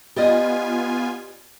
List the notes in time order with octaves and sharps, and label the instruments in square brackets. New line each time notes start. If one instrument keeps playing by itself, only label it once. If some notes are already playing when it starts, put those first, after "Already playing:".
[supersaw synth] B3 F4 G#5 [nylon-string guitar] G4 D5 D#5